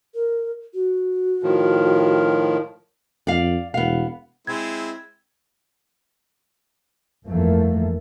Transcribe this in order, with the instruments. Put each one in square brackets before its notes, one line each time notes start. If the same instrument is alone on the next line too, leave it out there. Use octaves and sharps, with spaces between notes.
[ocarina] A#4
F#4
[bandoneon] A2 D#3 F3
[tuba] F2 [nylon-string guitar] D5 F5
[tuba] E1 [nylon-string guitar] B3 F5
[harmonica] G#3 C4 E4 [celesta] G#6
[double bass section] G1 F2 E3 F3 A3 A#3